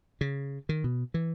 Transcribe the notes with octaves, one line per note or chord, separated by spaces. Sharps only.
C#3
D#3
B2
E3